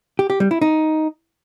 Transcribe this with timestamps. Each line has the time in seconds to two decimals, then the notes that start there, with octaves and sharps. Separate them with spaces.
0.19 G4
0.30 G4
0.40 G3
0.51 E4
0.62 D#4